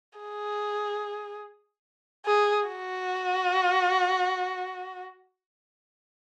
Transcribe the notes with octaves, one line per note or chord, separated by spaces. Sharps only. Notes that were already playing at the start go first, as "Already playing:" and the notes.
G#4
G#4
F#4